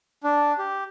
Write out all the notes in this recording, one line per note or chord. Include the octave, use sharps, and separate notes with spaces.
D4
G4